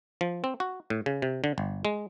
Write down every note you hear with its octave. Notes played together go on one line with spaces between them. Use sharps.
F3
C4
F#4
A2
C#3
C3
D3
G1
G#3